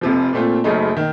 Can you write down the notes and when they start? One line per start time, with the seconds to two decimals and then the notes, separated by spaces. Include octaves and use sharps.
0.01 F1 F2 C3 F3
0.33 A#2 A3 C4 F4
0.64 F#1 F#2 C#3 A3 D#4
0.97 D#3